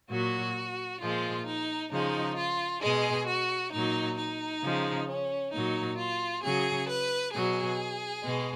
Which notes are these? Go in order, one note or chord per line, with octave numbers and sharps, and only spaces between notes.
A#2 F#3 F#4
A#2 F3 G#3 F4
D#4
C#3 F3 G#3 D#4
F4
B2 G#3 G#4
F#4
A#2 F#3 D#4
D#4
C#3 F3 G#3
C#4
A#2 F#3 D#4
F4
C#3 F#3 G#4
B4
B2 F#3 G#4
B2 G#3